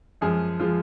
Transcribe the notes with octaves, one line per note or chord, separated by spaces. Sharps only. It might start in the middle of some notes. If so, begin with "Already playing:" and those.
F#2 F3 G#3 G#4
F3 G#3 F4